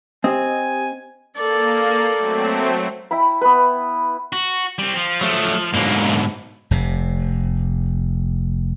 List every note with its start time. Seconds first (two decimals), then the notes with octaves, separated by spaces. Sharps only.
0.24 C4 G4 D#5 G#5
1.37 A#3 A4 D5
2.16 F#3 A3 C4
3.11 E4 G5 B5
3.41 B3 B4
4.33 F#4
4.79 G3 C4
4.95 F3
5.21 F#3 A3
5.74 G#2 B2 D3 F#3 A#3
6.71 F1 C3